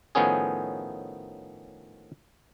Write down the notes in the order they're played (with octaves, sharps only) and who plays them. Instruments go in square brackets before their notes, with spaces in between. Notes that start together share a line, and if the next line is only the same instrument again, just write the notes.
[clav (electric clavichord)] A2 D#3 F3 B3 C#4 G#4